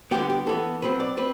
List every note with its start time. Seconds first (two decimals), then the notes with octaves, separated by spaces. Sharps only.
0.11 D3 G3 B3 G4
0.30 G4
0.47 E3 B3 A4
0.82 B2 F#3 C4 B4
1.00 D5
1.17 C4 B4